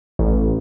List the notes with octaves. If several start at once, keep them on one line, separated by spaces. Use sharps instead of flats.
A1